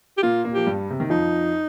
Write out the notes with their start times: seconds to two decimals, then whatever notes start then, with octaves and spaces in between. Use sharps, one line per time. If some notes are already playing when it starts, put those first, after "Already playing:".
0.18 G4
0.23 A#2 A#3 F4
0.45 A#2 A#3
0.52 F3 G4
0.67 G2 G3
0.90 C3
1.00 D#3
1.10 F2 F3 D#4